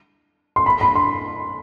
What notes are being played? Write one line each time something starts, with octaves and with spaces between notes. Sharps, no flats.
C6
B5
B5
C6